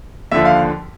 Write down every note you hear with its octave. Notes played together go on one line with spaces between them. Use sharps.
D#2 D3 F3 E5
F5